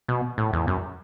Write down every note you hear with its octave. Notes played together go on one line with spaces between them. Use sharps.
B2
A2
E2
F#2